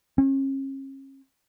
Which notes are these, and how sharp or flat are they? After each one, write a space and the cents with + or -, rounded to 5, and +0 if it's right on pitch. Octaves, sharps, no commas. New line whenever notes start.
C#4 -40